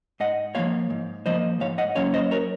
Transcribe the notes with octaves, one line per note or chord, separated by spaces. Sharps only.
G#2 D#5 F#5
F3 A#3 C#5 F5
G#2
F3 A#3 C5 D#5
G#2 C#5 F5
D#5 F#5
F#3 A#3 C#4 C#5 F5
C5 D#5
A#4 C#5